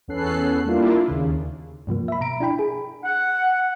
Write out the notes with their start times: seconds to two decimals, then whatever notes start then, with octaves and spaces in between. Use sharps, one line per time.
0.08 E2 B3 C#4 A4 F#6 C7
0.65 G3 A#3 D4 E4 F4
1.08 D#2 C#3
1.87 G2 C3 F3 A#3
2.08 E5 B5
2.21 B2 A#5 D7
2.40 D4 E4 G5 B5
2.59 G#4
3.04 F#5